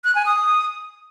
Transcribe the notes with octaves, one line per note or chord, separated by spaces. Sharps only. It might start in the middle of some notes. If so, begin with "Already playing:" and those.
F#6
G#5
D#6